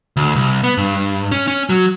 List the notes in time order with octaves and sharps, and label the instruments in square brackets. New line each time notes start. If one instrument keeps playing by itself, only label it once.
[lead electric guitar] D2
C2
B3
G2
C#4
C#4
F#3